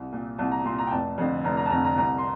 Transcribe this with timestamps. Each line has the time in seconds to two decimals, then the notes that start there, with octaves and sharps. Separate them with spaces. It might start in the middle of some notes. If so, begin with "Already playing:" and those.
Already playing: C2
0.12 A#2
0.38 C2 A5
0.52 A#5
0.64 A#2 C6
0.78 A#5
0.87 G5
0.91 F1 A5
1.18 F2 D3
1.44 F1 A#5
1.57 A#5
1.66 A5
1.70 F2 D3 A#5
1.85 A#5
1.98 C2 A#5
2.18 C6